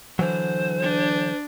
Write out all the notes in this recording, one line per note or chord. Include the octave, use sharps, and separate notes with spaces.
D3 E3 F#3 C5
D4